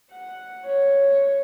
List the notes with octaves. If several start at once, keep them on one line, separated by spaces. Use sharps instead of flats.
F#5
C#5